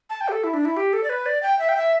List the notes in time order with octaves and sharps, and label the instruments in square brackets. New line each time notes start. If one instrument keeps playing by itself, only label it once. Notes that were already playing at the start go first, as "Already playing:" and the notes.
[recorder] A5
G5
G4
A4
E4
D4
E4
G4
A4
D5
B4
D5
G5
E5
G5
E5